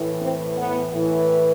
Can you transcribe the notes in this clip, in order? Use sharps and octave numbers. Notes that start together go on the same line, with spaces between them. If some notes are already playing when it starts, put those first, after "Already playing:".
Already playing: A2 E3
C4
B3
A2 E3